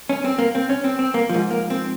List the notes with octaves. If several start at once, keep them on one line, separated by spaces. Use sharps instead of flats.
C#4
C4
A#3
C4
C#4
C4
C4
A#3
G#2 F3
A#3
C4